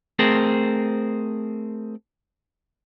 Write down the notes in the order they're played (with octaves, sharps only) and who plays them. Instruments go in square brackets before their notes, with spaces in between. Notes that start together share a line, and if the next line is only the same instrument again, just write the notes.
[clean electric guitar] A3 C4 G#4 A#4 C5